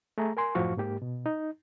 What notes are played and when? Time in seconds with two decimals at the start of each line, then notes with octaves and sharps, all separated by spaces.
0.18 A3 G#4 A#5
0.37 A#4 G#5 C6
0.55 F#2 A2 F3 F#4 F5 C#6
0.77 G#2 A#3 G4
1.02 B2
1.26 D#4